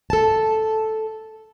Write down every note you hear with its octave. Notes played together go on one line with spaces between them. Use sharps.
A4 A5